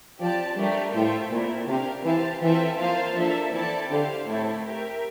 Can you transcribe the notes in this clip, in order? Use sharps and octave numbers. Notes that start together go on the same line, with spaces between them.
F3 C4 G4 D5 A5
G3 A3 D4 G4 A#4 D5
A2 F4 A4 C5 E5 G5
A#2 A3 C4 E4 A#4
C3 D4 G4 A#4 F5
E3 G4 C5 F5 A5
E3 C4 F4 A4 E5 G5
F3 A#3 F4 C5 F5 A5
F3 A#3 D4 A4 E5
E3 C4 E4 A4 D5 A5
D3 G4 C5 F5
A2 A3 C4 E4 A4 C5
G4 A#4 E5 G5